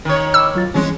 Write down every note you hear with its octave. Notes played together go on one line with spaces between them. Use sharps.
D#3 C#5
D#5 B5 D6 E6
F#3 F4 A6
E3 G3 G#3 C4 C#4